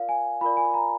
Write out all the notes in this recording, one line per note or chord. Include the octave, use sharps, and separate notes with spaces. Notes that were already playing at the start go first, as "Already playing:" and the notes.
Already playing: F4 A#4 D5 F5
G#5
F4 A#4 D5 B5
G#5
A#5